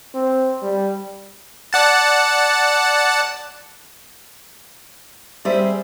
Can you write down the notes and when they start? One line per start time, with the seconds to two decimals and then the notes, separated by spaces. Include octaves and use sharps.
0.15 C4
0.63 G3
1.73 D5 F#5 A5
5.45 G3 C4 G#4 C5 E5